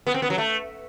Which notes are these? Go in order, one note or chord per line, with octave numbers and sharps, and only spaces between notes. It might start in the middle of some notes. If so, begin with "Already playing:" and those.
B3
C4
B3
F#3
A3